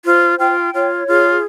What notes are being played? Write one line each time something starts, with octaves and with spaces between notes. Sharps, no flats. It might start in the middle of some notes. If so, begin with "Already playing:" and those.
F4 C5
F4 G5
F4 C#5
F4 G#4